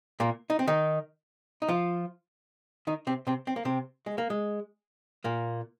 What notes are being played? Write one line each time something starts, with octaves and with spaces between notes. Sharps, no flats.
A#2 A#3
D#4
C4
D#3 D#4
D#4
F3 F4
D#3 D#4
C3 C4
C3 C4
C4
A#3
C3 C4
G#3
A#3
G#3
A#2 A#3